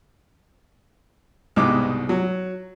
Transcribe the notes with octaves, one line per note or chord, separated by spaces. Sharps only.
C2 G#2 B2 D#4 D6
F#3